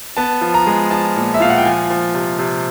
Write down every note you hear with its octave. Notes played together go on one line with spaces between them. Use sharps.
B3 A5
F3
A#5
G#3
F3 A5
A#2
E5
A#2 F5
F#5
G5
F3 G#5
F3
C3
C3